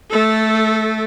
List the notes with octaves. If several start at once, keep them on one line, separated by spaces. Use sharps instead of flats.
A3 A4